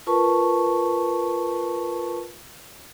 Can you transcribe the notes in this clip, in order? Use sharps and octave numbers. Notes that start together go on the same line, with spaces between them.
F4 A#4 B4 A5 C#6